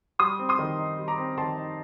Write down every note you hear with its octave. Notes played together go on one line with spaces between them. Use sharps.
G3 C6 D#6
C4
C6 D#6
D#3
D#4
G3
A#5 D6
C4
D#3 A5 C6
D#4